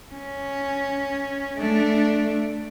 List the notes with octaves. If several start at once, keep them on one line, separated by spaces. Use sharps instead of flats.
C#4
A3 D4